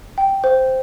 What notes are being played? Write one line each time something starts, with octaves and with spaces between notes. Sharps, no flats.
G5
C5